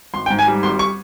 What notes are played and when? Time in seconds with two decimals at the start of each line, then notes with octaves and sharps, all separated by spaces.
0.13 G#1 C6
0.26 G5
0.30 G#2
0.39 G#5
0.47 G3
0.63 G#1 C6
0.79 C#6